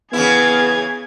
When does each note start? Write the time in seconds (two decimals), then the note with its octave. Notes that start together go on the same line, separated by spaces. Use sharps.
0.13 C#3 E3 B3 E4 G#4 G#6